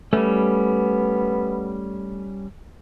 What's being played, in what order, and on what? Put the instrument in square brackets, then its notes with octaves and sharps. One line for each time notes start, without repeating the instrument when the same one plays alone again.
[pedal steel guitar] G3 C#4 [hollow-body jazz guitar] A3 [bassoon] B3